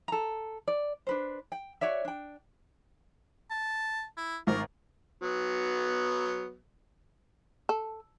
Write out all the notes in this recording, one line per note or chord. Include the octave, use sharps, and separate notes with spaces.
A4 A#5
D5
D4 B4 C5
G5
F#4 C#5 D5 E5
D4 G5
A5
E4
G#1 A#4
F#3 B3
A4